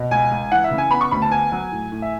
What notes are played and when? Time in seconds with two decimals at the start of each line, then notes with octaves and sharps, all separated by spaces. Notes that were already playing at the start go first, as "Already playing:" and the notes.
Already playing: B2
0.11 C#2 G#5
0.31 C#2
0.52 E3 F#5
0.64 E5
0.71 C#3
0.78 G#5
0.91 B3 B5
1.01 C#6
1.11 D2 B5
1.22 A5
1.31 B3 G#5
1.52 F#3
1.72 A2
1.92 A2
2.02 E5